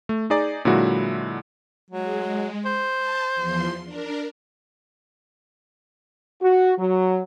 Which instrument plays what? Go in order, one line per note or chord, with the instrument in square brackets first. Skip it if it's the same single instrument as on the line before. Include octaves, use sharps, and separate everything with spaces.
[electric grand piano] A3
D#4 G#4 D5 A#5
A#2 D3 F#3 G#3 E4 F#4
[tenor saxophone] F#3 [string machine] G#3
[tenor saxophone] C5
[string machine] A5
E2 F3 C6
D4 A#4
[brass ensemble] F#4
F#3